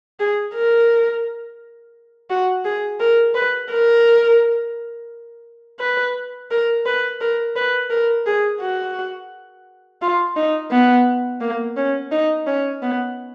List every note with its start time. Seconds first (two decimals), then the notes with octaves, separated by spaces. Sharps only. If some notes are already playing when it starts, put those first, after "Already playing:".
0.20 G#4
0.55 A#4
2.30 F#4
2.65 G#4
3.00 A#4
3.35 B4
3.71 A#4
5.80 B4
6.51 A#4
6.86 B4
7.21 A#4
7.56 B4
7.90 A#4
8.26 G#4
8.61 F#4
10.02 F4
10.36 D#4
10.71 B3
11.41 A#3
11.77 C#4
12.12 D#4
12.47 C#4
12.82 B3